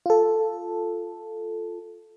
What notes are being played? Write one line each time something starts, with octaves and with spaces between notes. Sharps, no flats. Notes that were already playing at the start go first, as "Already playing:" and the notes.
F4 A4